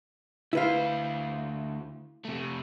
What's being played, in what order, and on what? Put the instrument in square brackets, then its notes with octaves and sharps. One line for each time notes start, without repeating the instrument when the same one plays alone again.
[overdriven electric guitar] D2 C5 [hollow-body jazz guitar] E4 B4 F5
[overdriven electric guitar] C3 A3